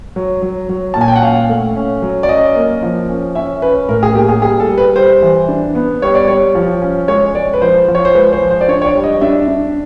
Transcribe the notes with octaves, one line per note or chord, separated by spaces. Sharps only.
F#3
F#3
F#3
A#2 A5
G#5
G5
F#5
C#4 F5
A3
C#4
F#3
D5
C#4 D#5
A#3
F3
C#4
C#4 E5
C#4 B4
A2 A#4
G#4
A#3 G4
G#4
G3 G#4
A4
G3
B4
G3 C5
E3
D4
B3
G3 C#5
D5
G3 C#5
F3
C#4
G#3 C#5
G#3 D5
B4
F3 C5
F3
C#5
C5
G#3 B4
C5
F3
C5
D5
D4 C#5
C#5
D5
G3
D#5
D4 E5
D4